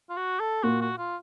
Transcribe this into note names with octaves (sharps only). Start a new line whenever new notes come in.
F4
F#4
A4
A#2 F#4
F#4
F4